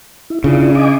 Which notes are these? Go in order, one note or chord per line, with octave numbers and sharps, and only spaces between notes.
E4
C#3 D4 E4 F4
D#5 G#5 D6